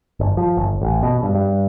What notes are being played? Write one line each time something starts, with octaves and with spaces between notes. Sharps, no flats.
G1
F3
G1
A1
B2
G2
G2